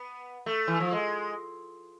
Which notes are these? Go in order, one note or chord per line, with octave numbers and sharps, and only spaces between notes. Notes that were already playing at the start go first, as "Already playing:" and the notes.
Already playing: B3
A3
E3
F3
G#3